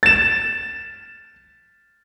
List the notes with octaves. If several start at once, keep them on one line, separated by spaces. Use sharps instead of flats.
A6 E7